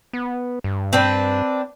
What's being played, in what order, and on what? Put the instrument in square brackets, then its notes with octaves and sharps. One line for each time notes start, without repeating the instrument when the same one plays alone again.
[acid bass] B3
G2
[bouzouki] C4 D4 B4